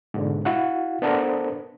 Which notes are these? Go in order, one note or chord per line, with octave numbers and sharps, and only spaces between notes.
G#2 B2 D3
E4 F#4 F5 F#5
B3 D4 A4 A#4 C5